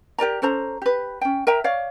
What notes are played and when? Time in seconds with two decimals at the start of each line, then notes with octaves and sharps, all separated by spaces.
0.18 G4 A#4 D5 A#5
0.42 C#4 A4 C5 A#5
0.82 G4 B4
1.21 C#4 G5
1.47 A#4 E5 G5 A#5
1.64 C#5 D5 F5